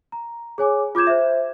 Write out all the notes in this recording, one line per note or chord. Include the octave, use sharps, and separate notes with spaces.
A#5
G#4 C#5 G#5 D6
F4 D6 G6 G#6 E7
C5 E5